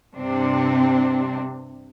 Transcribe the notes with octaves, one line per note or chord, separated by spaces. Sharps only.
G2 C3 C4 D4